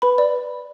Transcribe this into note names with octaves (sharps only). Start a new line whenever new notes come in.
B4 B5
D5